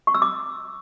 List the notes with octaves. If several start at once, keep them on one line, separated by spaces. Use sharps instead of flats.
C#6
E6
D6